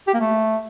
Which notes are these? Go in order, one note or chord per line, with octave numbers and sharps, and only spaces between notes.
G4
A#3
A3